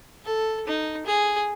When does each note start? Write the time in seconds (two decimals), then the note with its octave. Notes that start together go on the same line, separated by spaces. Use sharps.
0.25 A4
0.67 D#4
1.06 G#4